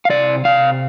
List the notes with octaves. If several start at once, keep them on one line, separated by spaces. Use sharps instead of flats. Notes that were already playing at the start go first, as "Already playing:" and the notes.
F5
C3 D5
C3 F5